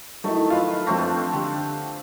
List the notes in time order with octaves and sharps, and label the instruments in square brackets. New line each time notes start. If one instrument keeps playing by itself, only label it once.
[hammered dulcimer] D#3 A3 [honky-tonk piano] F#3 D#4 E4
[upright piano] F4 [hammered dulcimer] B4 F5
[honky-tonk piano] F2 A#6 [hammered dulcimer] A3 C4 D4
[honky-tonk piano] D3 G4